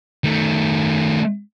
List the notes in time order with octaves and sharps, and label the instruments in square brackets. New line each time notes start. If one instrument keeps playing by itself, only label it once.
[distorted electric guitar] D#3 A3